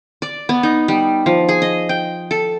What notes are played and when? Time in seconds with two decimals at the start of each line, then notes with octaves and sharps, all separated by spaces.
0.22 D5
0.49 B3
0.63 D#4
0.88 G3
1.26 F3
1.49 G#4
1.62 D#5
1.89 G5
2.31 A4